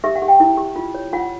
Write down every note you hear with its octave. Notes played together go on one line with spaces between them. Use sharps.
G4 E5
F#5
G4
G5
E4
G4
F4
C#5
F4 F#5